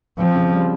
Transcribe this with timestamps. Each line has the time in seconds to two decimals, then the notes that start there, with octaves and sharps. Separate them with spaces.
0.19 F3 C4
0.36 C#3
0.53 G3